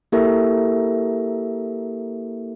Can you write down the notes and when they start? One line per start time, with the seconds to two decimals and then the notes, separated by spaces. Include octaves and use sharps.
0.12 A#3 E4 G4 A4 A#4 E5